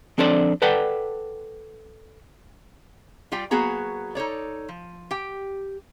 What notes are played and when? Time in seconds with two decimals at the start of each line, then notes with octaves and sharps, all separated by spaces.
0.18 F3 C4 D4 A4 C5 D5
0.62 A4 B4 D5 F#5 G5
3.32 G3 F4 G4 D5 G5
3.51 F#3 A#3 B3 F#4 G#4 A#5
4.15 D#4 A4 C#5 D5
4.69 F3
5.11 G4 G5